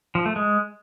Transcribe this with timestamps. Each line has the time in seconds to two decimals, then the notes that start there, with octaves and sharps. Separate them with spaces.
0.15 F3
0.26 A3
0.36 G#3